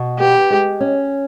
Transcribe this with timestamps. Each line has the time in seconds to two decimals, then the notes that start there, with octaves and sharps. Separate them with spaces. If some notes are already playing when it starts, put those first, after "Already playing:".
Already playing: B2
0.19 B3 G4
0.50 G#3
0.80 C#4